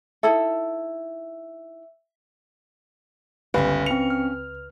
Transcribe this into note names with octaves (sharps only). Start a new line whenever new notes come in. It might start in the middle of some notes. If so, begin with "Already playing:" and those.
D#4 E4 A4 E5 E6
G1 C#2 C#4 B4 F5
C4 C#7 F7
F6